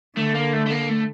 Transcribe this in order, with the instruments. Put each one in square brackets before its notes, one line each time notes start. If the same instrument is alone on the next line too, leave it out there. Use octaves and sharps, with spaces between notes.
[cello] D3 [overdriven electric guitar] A3
[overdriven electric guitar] A#3
A3
A3
A#3
A3